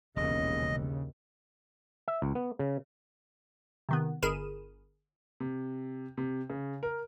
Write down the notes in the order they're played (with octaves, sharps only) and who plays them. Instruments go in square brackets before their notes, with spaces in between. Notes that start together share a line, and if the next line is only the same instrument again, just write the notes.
[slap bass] E1 [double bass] A#1 D#2 [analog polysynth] C#3 [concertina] D#5
[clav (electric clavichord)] E5
C#2
B3
C#3
[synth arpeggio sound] C3 D#3 B3
G1 G#4 A#4 B5 D#7 E7
[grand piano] C3
C3
C#3
A#4